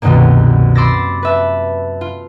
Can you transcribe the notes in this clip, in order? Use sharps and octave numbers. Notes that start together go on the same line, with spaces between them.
C2 F#2 B2 D#3 G3 A#3
B5 C6 D6 E6 A6 A#6
B4 E5 A5
F4